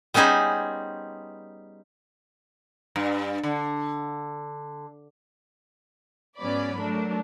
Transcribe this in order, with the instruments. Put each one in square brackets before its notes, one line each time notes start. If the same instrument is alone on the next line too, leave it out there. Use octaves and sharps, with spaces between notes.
[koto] G3 B3 C#4 D#4 G#4 C5
[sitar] G2
D3
[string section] G#2 F#3 B3 C#4 D5 B5
F#3 A3 D4 A#4